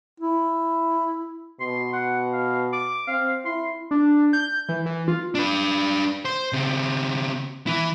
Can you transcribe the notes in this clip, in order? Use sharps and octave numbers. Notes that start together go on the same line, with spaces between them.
E4
B2 C6
F#5
F5
D6
C4 F5
E4 C6
D4
G6
E3
E3
F4
D4 B4
C5
C#3 C4
E3 E4